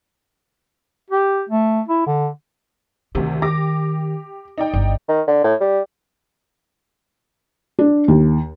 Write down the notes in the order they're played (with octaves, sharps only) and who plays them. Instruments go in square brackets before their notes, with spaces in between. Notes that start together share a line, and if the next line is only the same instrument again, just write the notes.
[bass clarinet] G4
A3
E4
D3
[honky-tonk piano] D2 C3 [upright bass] D#3
[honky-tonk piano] G4 D6 A#6
D#4 D5 G5
[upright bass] G1
[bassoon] D#3
D3
A2
G3
[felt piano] D4
D#2